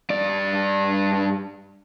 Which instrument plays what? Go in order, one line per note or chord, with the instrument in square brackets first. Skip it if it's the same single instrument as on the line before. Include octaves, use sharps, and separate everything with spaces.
[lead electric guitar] G2 D5